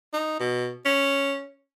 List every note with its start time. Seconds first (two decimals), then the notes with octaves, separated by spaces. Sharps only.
0.13 D#4
0.40 B2
0.85 C#4